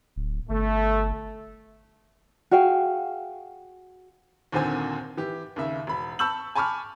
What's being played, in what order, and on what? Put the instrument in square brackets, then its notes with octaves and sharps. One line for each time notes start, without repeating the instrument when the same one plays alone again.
[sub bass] D1
[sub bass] G1 [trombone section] A3
[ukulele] F#4 G#4 F5 G5
[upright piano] D#2 A#2 D3 C4 C5 G#5
E3 G4
D#2 C#3 E5
E1 B5
A5 B5 C#6 E6 G6 F#7
G#5 A5 B5 C#6 D6 F6